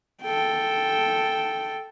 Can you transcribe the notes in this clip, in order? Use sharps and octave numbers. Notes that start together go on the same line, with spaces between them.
A4 G5